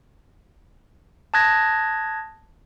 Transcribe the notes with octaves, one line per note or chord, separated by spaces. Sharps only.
A5 D#6 F#6 G#6 A#6